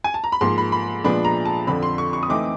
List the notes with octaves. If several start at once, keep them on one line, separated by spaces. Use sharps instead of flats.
G#5
A5
A#5
B5
G#2 F3 A#3 C6
B5
B5
A#2 F3 G#3 B3 D4 B5
A#5
A5
F2 D3 F3 B5
C6
C#6
C#6
D#6
E3 A3 C4 D#4 D6